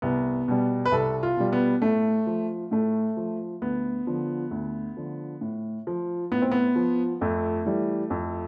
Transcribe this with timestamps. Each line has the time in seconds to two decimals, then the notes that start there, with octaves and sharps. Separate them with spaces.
0.02 C2 B3
0.48 B2 G3
0.85 B4
0.92 C2 A4
1.23 F4
1.37 B2 G3
1.53 B3
1.82 A2 A3
2.27 F3
2.71 A2 A3
3.17 F3
3.62 D2 B3
4.07 D3 F3
4.51 D2
4.97 D3 F3
5.41 A2
5.87 F3
6.32 A2 B3
6.42 C4
6.51 B3
6.76 F3
7.21 F2 A3
7.65 E3 G3
8.10 F2